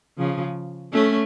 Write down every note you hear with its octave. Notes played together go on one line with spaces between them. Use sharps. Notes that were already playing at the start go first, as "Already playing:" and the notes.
C#3 F3
A3 C#4